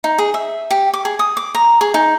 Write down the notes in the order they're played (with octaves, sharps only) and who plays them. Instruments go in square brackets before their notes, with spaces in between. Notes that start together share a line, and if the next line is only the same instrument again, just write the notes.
[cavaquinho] D#4
G#4
E5
G4
D6
G#4
D#6
D6
A#5
G#4
D#4